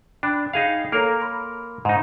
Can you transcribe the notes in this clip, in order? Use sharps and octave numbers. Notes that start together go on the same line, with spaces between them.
D4 G5 B5 F#6
D#4 G#4 F5
A#3 A4 A#4 C#5 A#5
B5 C6
G#2 D#4 A#5 B5